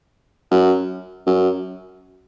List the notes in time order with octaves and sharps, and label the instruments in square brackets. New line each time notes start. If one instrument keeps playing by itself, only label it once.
[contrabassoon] F#2
F#2